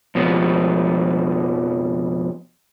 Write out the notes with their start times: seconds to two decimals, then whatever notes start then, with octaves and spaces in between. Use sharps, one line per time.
0.15 F2 B2 E3 F3